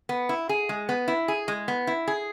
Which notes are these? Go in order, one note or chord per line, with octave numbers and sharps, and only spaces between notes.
B3
E4
G#4
G#3
B3
E4
G#4
G#3
B3
E4
G#4